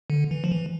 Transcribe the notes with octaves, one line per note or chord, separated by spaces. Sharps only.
D3
E3
F3
E3